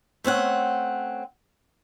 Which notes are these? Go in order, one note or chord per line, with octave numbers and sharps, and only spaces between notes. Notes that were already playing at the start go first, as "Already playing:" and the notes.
A3 C4 C#4 F#5